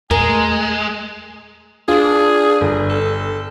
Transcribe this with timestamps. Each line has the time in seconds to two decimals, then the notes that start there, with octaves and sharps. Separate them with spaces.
0.11 E2 A#2 G#3 A#4 G#5
0.29 A3
1.88 D4 F4 G#4
2.61 G1
2.89 A4